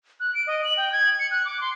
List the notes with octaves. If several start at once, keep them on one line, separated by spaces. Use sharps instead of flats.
F#6
D7
D#5
F#7
G5
G#6
C#7
F#6
D6
C6